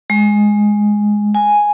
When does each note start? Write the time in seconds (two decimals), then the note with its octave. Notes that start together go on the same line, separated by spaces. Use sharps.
0.10 G#3
1.35 G#5